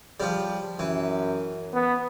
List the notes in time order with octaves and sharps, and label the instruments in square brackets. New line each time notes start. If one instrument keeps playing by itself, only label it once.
[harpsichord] F3 G3
[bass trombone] F#2 [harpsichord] E3
[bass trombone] B3